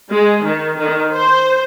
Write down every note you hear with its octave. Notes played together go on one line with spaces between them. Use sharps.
G#3
D#3
D#3
C5